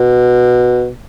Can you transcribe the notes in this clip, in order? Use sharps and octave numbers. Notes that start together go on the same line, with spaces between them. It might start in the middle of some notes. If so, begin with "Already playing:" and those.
Already playing: B2